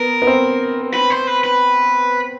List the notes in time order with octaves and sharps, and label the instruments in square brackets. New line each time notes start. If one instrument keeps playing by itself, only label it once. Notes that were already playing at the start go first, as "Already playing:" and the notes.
Already playing: [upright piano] B3 [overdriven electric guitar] A#4
[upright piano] B3
C4
[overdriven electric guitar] B4
C5
B4
B4